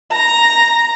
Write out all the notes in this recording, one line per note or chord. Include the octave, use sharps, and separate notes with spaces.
A#5